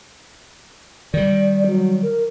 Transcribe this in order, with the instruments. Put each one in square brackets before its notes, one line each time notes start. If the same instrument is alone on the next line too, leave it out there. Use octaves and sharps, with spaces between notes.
[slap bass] D#3 G3 [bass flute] D5
[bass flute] F#3
A#4